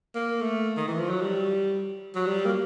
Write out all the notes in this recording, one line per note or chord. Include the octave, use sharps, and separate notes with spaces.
A#3
A3
D#3
E3
F3
F#3
G3
F#3
G3
A#3